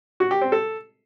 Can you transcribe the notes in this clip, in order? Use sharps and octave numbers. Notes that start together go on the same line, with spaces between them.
F#4
G4
C4
A4